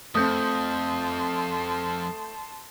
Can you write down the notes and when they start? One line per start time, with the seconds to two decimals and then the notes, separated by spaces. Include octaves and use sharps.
0.15 F2 A3 C4 A5 C6 D#6 G6